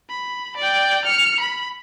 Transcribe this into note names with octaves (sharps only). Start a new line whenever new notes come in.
B5
D5 G5
F6 C#7
B5